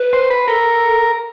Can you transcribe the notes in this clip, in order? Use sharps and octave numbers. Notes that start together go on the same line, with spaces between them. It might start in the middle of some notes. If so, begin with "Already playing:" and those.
Already playing: B4
C5
B4
A4 A#4